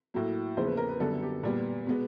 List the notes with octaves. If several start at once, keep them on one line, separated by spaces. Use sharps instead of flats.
A2 F#3 A#3
E2 C#3 F3 A#3 C5
B4
A#4
B4
F#2 D3 G3 B3 A4
G4
A#2 G3 B3
B2 G#3 B3